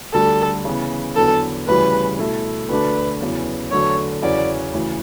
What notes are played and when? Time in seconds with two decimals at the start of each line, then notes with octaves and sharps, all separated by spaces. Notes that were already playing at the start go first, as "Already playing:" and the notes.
0.13 D2 D3 G3 A4
0.65 C#3 E3 B3
1.16 E2 D3 F#3 B3 A4
1.67 D2 C#3 E3 G3 B4
2.18 B2 A3 E4
2.69 D2 D3 A3 D4 B4
3.21 E2 C#3 F#3 B3
3.71 E2 D3 F#3 A3 E4 C#5
4.22 E2 C#3 F#3 C#4 F#4 D5
4.73 D2 C#3 E3